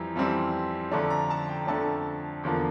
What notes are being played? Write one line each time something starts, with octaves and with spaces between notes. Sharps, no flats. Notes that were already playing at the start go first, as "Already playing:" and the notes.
Already playing: F2 E3 G3 A#5
F2 E3 G3 C4
F2 D3 A3 D4 A#5
A#5
A5
G5
F2 D3 A3 D4 A5
E2 D3 F3 A#3